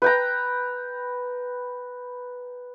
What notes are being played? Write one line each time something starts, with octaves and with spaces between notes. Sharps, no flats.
B4 G5 A#5